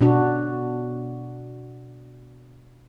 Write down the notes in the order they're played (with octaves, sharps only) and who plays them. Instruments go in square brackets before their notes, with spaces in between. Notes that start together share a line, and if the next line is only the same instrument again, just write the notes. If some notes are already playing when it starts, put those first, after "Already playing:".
[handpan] B2 D4 F#4